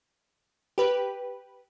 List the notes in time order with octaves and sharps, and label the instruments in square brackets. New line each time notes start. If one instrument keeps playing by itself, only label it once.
[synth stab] G4 B4